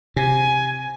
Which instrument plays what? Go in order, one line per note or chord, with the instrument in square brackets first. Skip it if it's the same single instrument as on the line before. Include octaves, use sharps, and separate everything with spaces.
[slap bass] C3 [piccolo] G#5